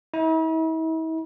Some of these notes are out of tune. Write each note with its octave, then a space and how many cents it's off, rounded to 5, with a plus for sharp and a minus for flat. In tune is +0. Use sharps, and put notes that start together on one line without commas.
E4 -45